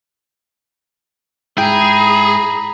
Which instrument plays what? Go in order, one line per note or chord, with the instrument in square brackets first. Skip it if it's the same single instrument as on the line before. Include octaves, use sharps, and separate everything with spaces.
[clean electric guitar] G#2 E4 [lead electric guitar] G#4 [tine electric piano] G5 [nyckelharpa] A#5 B5